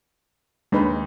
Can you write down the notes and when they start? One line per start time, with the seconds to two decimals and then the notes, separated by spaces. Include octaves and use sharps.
0.72 D#2 G#3 D4 D#4 B4